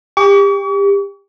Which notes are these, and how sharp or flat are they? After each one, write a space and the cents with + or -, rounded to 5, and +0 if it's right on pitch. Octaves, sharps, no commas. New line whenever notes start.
G4 +30 C#6 +45